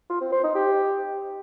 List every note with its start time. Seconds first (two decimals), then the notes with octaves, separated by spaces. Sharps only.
0.10 F4
0.21 C4
0.32 C5
0.43 D#4
0.55 G4